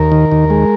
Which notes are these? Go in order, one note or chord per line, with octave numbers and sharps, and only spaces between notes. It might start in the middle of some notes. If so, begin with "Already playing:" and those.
Already playing: D#2 A#4
D#3
D#2
G#3